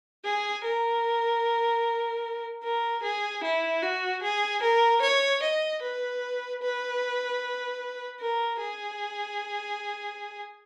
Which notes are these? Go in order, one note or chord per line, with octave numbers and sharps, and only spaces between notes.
G#4
A#4
A#4
G#4
E4
F#4
G#4
A#4
C#5
D#5
B4
B4
A#4
G#4